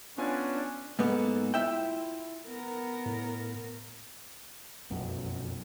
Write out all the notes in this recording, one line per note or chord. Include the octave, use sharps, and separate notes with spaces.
B3 C#4 D4 F4 G#5
G#2 A#3 B3 A4
E4 F4 E5 G5
B3 A#4
A2
F1 B1 F#2